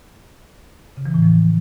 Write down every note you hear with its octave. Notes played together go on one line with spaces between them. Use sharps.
C#3
E3
A2
F3